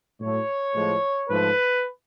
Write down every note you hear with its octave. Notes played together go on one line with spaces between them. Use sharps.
A2 F#3 A3 C#5
A2 F3 G#3
G#2 F3 A3 B4